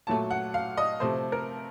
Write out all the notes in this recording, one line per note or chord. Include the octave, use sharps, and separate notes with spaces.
A#2 F#3 A3 A5
F#5
F5
D#5
C3 F3 A3 C5
A#4